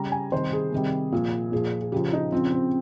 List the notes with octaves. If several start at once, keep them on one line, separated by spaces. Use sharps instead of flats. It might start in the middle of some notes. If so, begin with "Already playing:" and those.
Already playing: C#3 G3 A#5
G#5
C3 D#3 G3 C5
G#4
C3 D#3 G3
A#2 F3
A#2 F3 G#4
G#4
C#3 F3 G4
D#4
C#3 F3 C4
C4